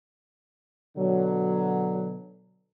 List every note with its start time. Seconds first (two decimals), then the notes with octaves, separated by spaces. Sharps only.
0.97 B2 D3 F#3